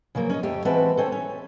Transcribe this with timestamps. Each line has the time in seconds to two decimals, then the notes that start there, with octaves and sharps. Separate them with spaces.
0.15 C#3 F3 F#3 A#3
0.30 C#4 C#5 D#5
0.43 F2 A3 G4
0.65 E3 G#3 C4 F#4 B4 A5
0.97 C4 C#4 A4
1.12 C#4